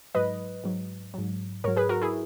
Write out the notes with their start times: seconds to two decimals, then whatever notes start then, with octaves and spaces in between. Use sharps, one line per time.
0.15 G#2 F#3 B4 D#5
0.64 G#2 F#3
1.14 G#2 F#3
1.64 G#2 F#3 A#4 C#5
1.77 G#4 B4
1.89 F#4 A#4
2.02 E4 G#4